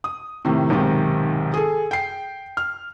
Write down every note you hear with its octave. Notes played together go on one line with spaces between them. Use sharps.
D#6
A2 C3 D#3
B1 G#2 C3 D#3
G#4 A4
G5 C7
F6